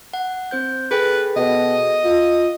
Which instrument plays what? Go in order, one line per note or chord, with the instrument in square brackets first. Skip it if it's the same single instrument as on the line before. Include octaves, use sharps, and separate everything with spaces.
[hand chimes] F#5
C4 C5 G6
[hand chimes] G#4 A4 G5 [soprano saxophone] B4
[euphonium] B2 [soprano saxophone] D#5
[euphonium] F4